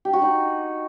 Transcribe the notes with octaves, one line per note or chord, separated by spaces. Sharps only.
G4
F#4
D#4